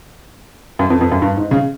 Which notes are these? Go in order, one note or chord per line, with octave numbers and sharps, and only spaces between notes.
F#2
F2
F2
F#2
G2
G#2
C#3